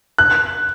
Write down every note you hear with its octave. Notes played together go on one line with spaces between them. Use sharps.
F#6